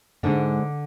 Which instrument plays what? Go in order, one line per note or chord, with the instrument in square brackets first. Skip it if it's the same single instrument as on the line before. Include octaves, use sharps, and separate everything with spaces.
[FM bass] G#2 [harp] D3 D4